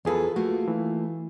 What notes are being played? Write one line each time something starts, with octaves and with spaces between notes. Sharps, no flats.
E2 F4 G#4 A4 B4
A3 A#3 F4 F#4
E3